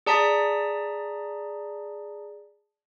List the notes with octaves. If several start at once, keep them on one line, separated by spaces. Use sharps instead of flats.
G#4 D5 A5 A#5 D#6 B6